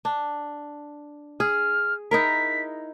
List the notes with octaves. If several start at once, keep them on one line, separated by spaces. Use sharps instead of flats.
D4
G#4 F6
D#4 E4 A#4 B6